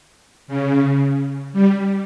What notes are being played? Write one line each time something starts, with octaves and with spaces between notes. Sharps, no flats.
C#3
G3